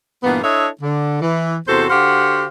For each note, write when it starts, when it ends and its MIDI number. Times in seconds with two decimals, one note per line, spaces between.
0.23 0.41 43
0.23 0.41 46
0.23 0.41 52
0.23 0.41 58
0.23 0.41 59
0.43 0.67 62
0.43 0.67 64
0.43 0.67 69
0.43 0.67 73
0.43 0.67 75
0.43 0.67 76
0.81 1.17 50
1.22 1.57 52
1.68 1.85 40
1.68 1.85 48
1.68 1.85 66
1.68 1.85 69
1.68 1.85 72
1.90 2.44 50
1.90 2.44 66
1.90 2.44 67
1.90 2.44 72
1.90 2.44 77
1.90 2.44 78